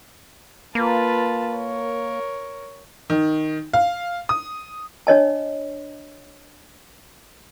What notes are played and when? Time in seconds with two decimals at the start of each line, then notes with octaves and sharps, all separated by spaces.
0.75 A#3 F4 B4 A5
1.55 A#4 C#5
3.10 D#3
3.74 F5
4.29 D#6
5.07 D4 C#5 D#5 A5